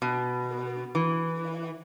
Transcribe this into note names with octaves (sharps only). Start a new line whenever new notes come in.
B2
E3